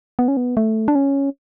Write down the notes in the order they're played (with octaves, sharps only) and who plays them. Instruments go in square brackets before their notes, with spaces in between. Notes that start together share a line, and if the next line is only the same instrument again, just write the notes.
[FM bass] B3
C#4
B3
A3
D4
C#4